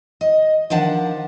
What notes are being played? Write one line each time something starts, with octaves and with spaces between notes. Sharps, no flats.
D#5
D#3 F3 D4 F#5 A5